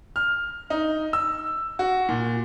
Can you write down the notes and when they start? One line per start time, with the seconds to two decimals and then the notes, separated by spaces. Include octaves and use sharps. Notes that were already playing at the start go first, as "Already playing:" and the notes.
0.16 F6
0.70 D#4
1.13 E6
1.79 F#4
2.09 A#2